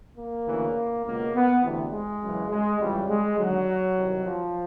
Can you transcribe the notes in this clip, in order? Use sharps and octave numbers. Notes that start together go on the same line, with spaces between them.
A#3
D2 C#3 E3
C#2 B2 A#3
B3
D2 C3 E3
G#3
F#2 C#3 E3
G#3
F2 C#3 E3 G3
G#3
D#2 D3 F#3
C2 C3 D#3
F3